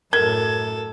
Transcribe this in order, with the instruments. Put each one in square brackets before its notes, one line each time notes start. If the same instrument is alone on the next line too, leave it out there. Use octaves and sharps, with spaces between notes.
[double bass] F#2 A2 [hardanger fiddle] A4 [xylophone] A#4 [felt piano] G#6